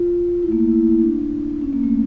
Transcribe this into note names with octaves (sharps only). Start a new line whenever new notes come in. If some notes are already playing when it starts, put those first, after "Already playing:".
Already playing: F4
E4
A3
A#3
E4
E4
D4
C#4
A#3
A3